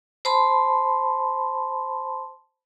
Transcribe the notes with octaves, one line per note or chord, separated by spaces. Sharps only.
C5 A5 B5 C6